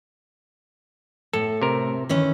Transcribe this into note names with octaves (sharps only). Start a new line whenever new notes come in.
A2 A4
C3 A#4
D#3 E3 C#4